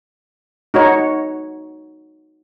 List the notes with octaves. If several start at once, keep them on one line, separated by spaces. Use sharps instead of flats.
D#4 F#4 C#5